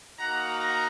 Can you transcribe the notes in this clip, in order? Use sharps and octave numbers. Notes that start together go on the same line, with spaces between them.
A#3 D#4 F#4 F#5 A#5
F#5 A#5